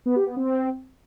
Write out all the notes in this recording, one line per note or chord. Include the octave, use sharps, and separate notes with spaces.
B3
G4
B3
C4